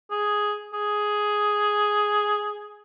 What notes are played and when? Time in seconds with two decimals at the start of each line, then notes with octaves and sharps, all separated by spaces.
0.11 G#4
0.73 G#4